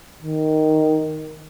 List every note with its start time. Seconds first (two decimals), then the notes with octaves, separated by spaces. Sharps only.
0.22 D#3